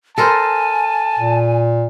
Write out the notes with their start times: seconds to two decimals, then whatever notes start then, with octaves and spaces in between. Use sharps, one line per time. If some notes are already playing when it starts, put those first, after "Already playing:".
0.18 A4 A#4 C5 G#5 A5
1.19 A#2